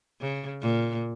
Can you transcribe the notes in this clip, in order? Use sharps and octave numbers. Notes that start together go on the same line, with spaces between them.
C#3
A#2